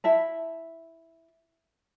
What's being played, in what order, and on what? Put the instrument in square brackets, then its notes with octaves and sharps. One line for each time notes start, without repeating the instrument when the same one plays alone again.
[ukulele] E4 E5 A5